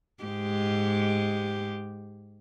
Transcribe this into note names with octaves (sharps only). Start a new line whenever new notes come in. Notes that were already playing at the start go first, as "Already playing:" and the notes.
G#2 G#3 G4